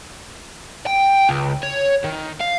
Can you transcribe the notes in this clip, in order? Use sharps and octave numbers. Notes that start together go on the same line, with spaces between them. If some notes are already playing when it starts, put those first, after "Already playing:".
G5
C#2
C#5
D#3
F5